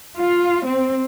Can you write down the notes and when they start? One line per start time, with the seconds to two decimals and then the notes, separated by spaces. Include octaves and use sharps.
0.18 F4
0.67 C4